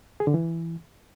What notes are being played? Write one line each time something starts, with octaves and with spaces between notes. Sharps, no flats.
G#4
D3
E3